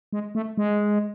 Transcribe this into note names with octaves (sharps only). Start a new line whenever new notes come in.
G#3
A3
G#3